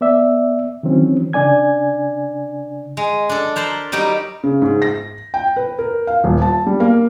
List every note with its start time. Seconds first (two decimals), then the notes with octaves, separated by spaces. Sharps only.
0.01 B3 D5 E5
0.83 D#3 E3 F#3 C4 C#4
1.33 C#3 D4 D5 G#5 G#6
2.97 G#3
3.29 D4 A4
3.56 A#4 C5 A5 B5
3.92 F#3 G3 D#4 G4
4.43 C#3
4.62 G#2
4.82 A#6
5.34 G5
5.56 B4
5.78 A#4
6.07 F5
6.24 D#1
6.42 A5
6.66 G3
6.80 A#3